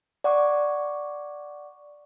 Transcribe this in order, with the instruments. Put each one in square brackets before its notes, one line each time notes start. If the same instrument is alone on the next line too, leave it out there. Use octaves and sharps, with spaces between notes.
[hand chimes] D5 F#5 C#6 D6